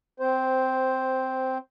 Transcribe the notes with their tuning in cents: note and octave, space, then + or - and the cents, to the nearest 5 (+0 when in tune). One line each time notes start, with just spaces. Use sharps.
C4 -10 C5 +0